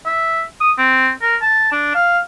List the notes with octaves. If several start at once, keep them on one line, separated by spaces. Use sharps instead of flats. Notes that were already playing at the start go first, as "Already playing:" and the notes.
E5
D#6
C4
A#4
A5
D4
F5